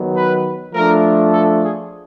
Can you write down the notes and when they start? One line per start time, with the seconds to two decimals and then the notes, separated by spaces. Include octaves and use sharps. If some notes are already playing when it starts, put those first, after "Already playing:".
Already playing: D#3 F#3 B3
0.15 B4
0.74 F3 A3 D4 A#4
1.33 A4
1.64 G#4